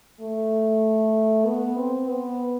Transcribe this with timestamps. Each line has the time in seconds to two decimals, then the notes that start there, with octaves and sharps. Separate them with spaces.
0.20 A3
1.46 B3
1.78 C4
2.09 B3